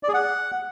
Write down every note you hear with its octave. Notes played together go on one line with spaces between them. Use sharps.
D5
G#4
F#5